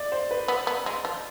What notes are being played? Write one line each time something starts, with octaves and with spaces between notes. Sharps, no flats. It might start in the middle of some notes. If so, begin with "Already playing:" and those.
Already playing: D5 D#5
C5
B4
B3
B3
G#3
F3